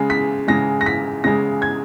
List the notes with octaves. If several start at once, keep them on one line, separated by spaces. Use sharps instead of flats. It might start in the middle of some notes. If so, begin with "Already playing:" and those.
Already playing: C#3 G#3
B6
C#3 G#3 A#6
A#6
B6
C#3 G#3 A#6
G#6